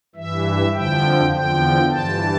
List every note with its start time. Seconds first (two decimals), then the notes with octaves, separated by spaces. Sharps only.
0.15 G2 E3 E5
0.74 F2 D3 F3 G5
1.33 E2 D3 F3 G5
1.90 G2 E3 A5